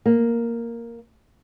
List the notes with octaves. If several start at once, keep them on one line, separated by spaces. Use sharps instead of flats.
A#3